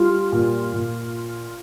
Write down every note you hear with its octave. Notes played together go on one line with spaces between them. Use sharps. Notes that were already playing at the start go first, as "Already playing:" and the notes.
Already playing: G3 F4
A#2
A#2